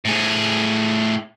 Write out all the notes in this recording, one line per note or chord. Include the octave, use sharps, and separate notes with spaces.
A2 G#4